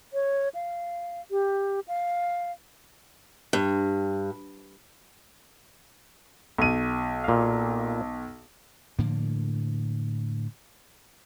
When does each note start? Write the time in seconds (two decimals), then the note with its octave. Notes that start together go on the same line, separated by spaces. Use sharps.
0.13 C#5
0.55 F5
1.31 G4
1.88 F5
3.53 G2
6.58 B1 D#7
7.24 A#2 F5
8.99 A2 D3 F3 A#3